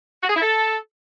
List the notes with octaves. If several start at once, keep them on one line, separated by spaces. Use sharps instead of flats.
F#4
G#4
E4
A4